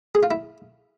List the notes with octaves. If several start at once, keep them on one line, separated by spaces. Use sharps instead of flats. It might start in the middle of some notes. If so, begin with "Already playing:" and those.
G#4
F4
E4